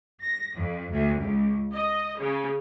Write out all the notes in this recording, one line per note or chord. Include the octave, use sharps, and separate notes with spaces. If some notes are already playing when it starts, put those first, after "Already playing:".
A#6
F2
D2
C#2
D#5
C#3